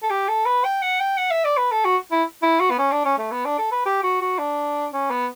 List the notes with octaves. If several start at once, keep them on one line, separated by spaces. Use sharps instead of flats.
A4
G4
A4
B4
G5
F#5
G5
F#5
E5
D5
B4
A4
F#4
E4
E4
F#4
B3
C#4
D4
C#4
A3
B3
D4
A4
B4
G4
F#4
F#4
D4
C#4
B3